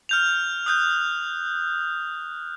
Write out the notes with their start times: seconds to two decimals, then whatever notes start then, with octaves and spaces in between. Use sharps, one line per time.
0.09 F6 G6 F7
0.66 D#6 F#6 G6